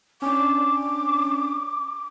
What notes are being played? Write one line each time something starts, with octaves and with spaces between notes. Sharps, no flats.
C#4 D4 D6